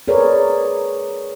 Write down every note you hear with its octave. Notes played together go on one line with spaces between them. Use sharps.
G#4 A#4 B4 C#5 D5